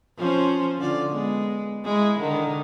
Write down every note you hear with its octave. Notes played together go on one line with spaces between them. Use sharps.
F3 C#4 C5
D3 F4 D5
G#3 B3
G#3 E4
D3 D#3